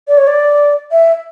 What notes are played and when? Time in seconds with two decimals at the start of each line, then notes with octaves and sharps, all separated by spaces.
0.08 D5
0.17 C#5
0.27 D5
0.92 E5